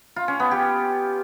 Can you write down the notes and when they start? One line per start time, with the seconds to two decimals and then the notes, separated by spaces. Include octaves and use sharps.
0.16 F4
0.28 C#4
0.40 B3
0.51 G4